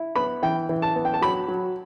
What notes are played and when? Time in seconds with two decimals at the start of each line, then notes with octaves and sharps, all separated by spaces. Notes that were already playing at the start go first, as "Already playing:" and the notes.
Already playing: E4
0.16 B3 B5
0.42 E3 G5
0.69 E3
0.82 A5
0.96 B3
1.05 G5
1.14 A5
1.21 F#3 B5
1.48 F#3